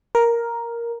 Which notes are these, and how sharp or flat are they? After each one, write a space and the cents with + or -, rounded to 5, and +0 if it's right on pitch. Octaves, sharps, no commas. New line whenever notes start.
A#4 +5